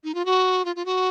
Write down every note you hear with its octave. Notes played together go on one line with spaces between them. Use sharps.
D#4
F4
F#4
F4
F4
F#4